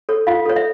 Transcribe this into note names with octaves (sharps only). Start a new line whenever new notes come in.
A4 C#5
F4 F5
A4 C#5
E5